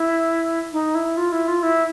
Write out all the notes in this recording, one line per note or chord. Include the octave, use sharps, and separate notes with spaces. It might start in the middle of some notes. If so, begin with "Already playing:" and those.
Already playing: E4
D#4
E4
F4
E4
F4
E4